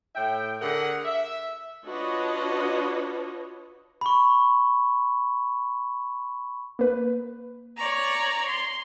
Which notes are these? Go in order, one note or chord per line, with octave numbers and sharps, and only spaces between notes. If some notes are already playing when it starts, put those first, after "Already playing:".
A2 E5 G5
D3 G#4 A#4 F#5
E5
D4 F4 F#4 B4 C#5 D#5
B5 C#6
A#3 B4
C#5 D5 A#5
C6